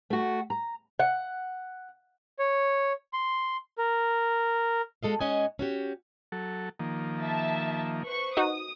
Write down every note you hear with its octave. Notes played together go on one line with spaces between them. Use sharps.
A3 F#4
A#5
F#5
C#5
C6
A#4
B2 G#3 A4 D#5 F5
G#2 G#3 C#4 D#5 F#5 G#5
C#4 F#4 G4
F#3 A4
D#3 F3 A#3
E5 A5
B4 C5 C#6
D#4 F#4 D#6